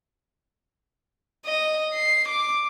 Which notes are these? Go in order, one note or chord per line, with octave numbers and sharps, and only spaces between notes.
D#5
C7
D6